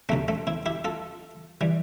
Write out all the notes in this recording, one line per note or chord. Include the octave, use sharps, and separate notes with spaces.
D2 C3 F3 A3 C4
A3 C4
C4 E4
E4 G4
F4 A4
E3 G3